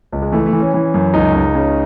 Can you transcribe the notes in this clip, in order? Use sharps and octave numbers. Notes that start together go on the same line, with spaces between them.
C#2
G#3
E3 A3
A3
E3
C#4
E3
F#2
C#2 D#4
C#2
C#3